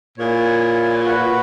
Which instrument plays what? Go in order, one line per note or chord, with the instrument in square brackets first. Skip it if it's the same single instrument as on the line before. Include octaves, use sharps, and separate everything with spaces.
[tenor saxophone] A#2 [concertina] E4 G#4 C#5
[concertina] F#4 B4 F#5